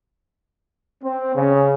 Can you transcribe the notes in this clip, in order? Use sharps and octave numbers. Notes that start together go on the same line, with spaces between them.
C4
C#3